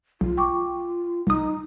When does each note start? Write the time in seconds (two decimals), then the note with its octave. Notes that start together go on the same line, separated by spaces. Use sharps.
0.21 B1 F4
0.37 G5 C#6 D6
1.27 C2 D#4 D#6